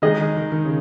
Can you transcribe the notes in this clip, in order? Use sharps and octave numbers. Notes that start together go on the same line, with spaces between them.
D#3 G#3 D#4 G#4 D#5
D#3
D#3
D#3
C#3